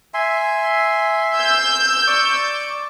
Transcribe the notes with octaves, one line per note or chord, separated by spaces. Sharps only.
E5 G#5 C6
E6 G6
D5 C#6 D6